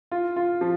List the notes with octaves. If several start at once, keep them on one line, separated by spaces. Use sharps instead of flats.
F4
F4
F3